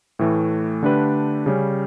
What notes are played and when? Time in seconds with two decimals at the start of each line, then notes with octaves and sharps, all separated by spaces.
0.19 A2 E3 A3
0.83 D3 A3 D4 G4 B4
1.46 C#3 G3 C#4